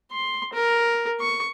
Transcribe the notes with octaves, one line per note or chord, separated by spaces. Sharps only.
C6
A#4
C#6